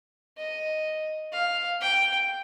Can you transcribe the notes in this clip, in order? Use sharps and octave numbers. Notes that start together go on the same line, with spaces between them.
D#5
F5
G5